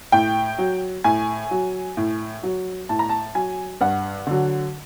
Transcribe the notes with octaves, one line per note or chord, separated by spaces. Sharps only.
A2 G5
F#3
A2 G#5
F#3
A2
F#3
A2 A5
A#5
A5
F#3 G#5
G2 F#5
D3 F#3